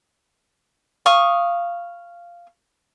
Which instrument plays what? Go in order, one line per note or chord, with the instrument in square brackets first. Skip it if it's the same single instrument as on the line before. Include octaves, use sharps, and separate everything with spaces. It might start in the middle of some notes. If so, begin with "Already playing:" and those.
[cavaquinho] F5 C#6 D#6